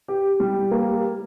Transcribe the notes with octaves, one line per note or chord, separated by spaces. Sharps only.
G4
G3
A#3